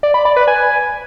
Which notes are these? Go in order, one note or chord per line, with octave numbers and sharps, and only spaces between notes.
D5
B5
D5
B4
G#5